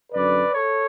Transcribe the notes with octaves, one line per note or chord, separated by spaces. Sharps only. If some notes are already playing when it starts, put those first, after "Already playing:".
F#2 D3 B4 D5
A4 C#5